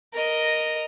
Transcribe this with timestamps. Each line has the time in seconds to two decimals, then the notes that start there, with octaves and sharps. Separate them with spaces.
0.14 A#4 D#5